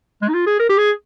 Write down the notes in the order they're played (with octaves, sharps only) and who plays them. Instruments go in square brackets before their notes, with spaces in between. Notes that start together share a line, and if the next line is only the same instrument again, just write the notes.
[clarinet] G#3
D#4
F4
G#4
A#4
G4
G#4